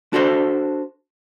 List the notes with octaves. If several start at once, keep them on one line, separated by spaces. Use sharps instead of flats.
D4 F#4 A4 C5